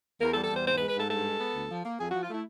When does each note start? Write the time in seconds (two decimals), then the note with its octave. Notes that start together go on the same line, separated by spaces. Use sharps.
0.21 E2 A#4
0.32 A4
0.35 G3
0.43 A4
0.51 E2 C5
0.66 G#2 C5
0.77 B4
0.80 G#3
0.88 B4
0.95 G#2 A4
1.10 G2 A4
1.25 G#3
1.40 B3
1.54 D2
1.70 F3
1.85 A#3
2.00 F2 G#4
2.10 F3 F#4
2.22 F4
2.29 A3 E4